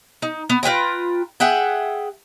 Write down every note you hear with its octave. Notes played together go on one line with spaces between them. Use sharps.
D#4
B3
F4 B4 G5 A#5
G#4 E5 F#5 G5